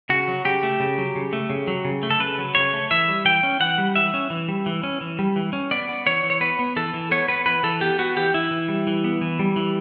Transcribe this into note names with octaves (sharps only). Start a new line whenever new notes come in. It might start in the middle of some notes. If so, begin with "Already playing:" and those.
C#3 F#4
F#3
C#3 G4
A3
C#3
F#3
C#3
A3
C#3
F#3
C#3
A3
A4
C#3 B4
F#3
C#3 C#5
A3
E3 E5
G3
E3 G5
C#4
E3 F#5
G3
E3 E5
C#4
E3
G3
E3
C#4
E3
G3
E3
C#4
B3 D5
B3
E3 C#5
E3
C#5
B3 B4
B3
E3 A4
E3
B3 C#5
B3 B4
E3 B4
E3 A4
B3 G4
B3 F#4
E3 G4
E3 E4
E3
G3
E3
B3
E3
G3
E3